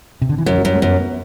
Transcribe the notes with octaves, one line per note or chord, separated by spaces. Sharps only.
C3
D3
E3
F#2 F#3
F#3
F#2 G3
A3
F#2 B3
B3